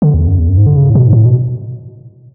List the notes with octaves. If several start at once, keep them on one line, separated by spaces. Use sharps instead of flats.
D3
E2
F#2
E2
F#2
G#2
D3
C#3
A2
B2
G#2
A2
B2